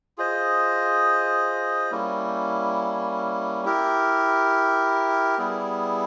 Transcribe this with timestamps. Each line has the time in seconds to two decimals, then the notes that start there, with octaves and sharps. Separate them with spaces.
0.18 F4 G#4 C5 D#5
1.91 G3 A#3 C#4 E4
3.65 E4 G4 A#4
5.38 G3 B3 E4 G#4